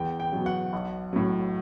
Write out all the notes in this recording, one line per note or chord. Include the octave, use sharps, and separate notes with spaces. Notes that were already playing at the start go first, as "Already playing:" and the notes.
Already playing: E2 G5
G5
B2 F#3
F#5
B1
A2 F#3